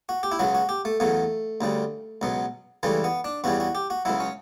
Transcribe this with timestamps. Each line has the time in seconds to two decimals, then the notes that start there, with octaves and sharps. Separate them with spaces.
0.09 F#4
0.23 G4
0.32 E4
0.39 C#2 C#3 F#3 F#4
0.55 F#4
0.69 G4
0.85 A3
1.00 E2 C#3 F#3 A3
1.61 D2 C#3 G3
2.22 C#2 B2 F#3
2.83 C#2 C#3 E3 G3 A3
3.04 B3
3.24 D4
3.44 E2 C#3 E3 G3 F#4
3.60 F#4
3.75 G4
3.90 F#4
4.05 C#2 C#3 F#3 E4
4.20 C#4